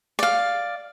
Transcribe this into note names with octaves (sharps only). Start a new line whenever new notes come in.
D5 F5